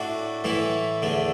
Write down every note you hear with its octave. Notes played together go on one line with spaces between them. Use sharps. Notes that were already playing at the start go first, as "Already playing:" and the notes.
Already playing: A2 A3 D4 F#4
A2 E3 A3 E4
E2 D3 A3